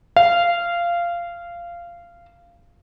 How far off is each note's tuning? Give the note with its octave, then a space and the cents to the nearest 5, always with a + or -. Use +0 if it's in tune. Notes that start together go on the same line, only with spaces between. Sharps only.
F5 -15